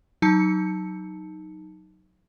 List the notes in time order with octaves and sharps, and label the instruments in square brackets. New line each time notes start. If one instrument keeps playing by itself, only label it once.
[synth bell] F#3 D#4 A5 C#7